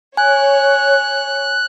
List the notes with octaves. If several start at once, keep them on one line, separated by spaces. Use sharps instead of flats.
C#5 G#5 F#6